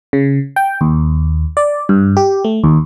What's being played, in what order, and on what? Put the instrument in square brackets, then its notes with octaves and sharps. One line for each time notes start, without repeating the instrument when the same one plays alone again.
[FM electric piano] C#3
G5
D#2
D5
G2
G4
A3
D#2